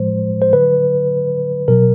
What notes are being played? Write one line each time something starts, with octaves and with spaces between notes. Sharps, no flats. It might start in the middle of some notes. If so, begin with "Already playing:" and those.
Already playing: A2 F3 G#3 C5
C5
D3 F#3 B4
B2 F#3 A#4